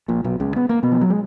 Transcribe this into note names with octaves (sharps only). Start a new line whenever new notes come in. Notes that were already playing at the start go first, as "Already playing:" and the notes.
A#1 A#2
B1 B2
C#2 C#3
B3
A#3
B2 B3
F3
F#3
G#3